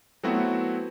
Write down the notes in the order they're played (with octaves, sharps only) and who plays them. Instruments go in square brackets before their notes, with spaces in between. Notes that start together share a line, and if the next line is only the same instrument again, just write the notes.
[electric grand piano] F#3 A3 B3 C4 E4 F#4